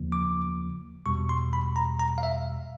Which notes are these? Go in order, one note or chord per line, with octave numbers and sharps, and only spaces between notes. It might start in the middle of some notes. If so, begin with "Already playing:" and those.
Already playing: D#2 C#3 F3 A#3
D6
E2 B2 G3 C#6
C6
B5
A#5
A#5
F5
E5